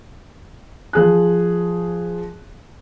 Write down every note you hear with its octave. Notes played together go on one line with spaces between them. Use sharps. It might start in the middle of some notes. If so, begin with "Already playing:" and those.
F3 G#4 F#6